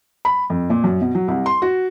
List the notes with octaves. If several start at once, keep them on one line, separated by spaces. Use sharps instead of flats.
B5
F2
A#2
F#2
B2
F#3
C2
C6
F#4